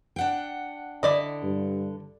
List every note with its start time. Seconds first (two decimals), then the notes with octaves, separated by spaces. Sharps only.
0.16 D4 F#5 G5
1.03 D3 E4 D5 D#5
1.43 G2